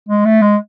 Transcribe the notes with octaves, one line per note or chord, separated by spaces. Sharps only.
G#3
A3
G#3